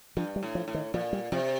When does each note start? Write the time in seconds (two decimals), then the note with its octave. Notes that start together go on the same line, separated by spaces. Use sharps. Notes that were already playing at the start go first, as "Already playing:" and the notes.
0.17 G2 F3
0.36 G3
0.43 A2
0.55 F3
0.68 A2
0.74 D#3
0.94 A#2 F3
1.13 G3
1.32 C3 F3